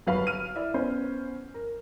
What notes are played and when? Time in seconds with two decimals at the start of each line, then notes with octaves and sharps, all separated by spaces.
0.07 G1 F#3 B4 F5 B5
0.27 F6 D#7
0.56 E4 D5 E5
0.74 B3 C#4 C5
1.54 A#4